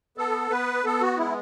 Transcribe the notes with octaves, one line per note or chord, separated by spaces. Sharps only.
B3 A4
B3 B4
B3 A4
F#4
G#3 E4